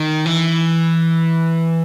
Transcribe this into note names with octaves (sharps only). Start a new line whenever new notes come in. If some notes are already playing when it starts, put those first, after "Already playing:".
Already playing: D#3
E3